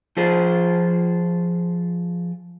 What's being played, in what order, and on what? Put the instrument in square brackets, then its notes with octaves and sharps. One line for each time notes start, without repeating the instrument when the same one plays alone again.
[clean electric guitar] F3 F4 G#4 C5